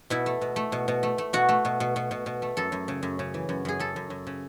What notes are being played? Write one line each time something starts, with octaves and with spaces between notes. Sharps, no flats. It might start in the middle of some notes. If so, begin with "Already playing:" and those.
B2 E4
A3
B2
A3
B2
B2
A3
A3
B2 F#4
A3
B2
B2
B2
B2
B2
A3
F#2 A4
F#2
C#3
F#2
C#3
E3
F#2
F#2 G#4
F#2 A4
F#2
F#2
C#3